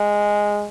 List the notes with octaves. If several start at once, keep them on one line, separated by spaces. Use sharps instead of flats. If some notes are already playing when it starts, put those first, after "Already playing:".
Already playing: G#3